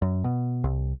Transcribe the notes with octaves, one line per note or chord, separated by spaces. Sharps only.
F#2
B2
C2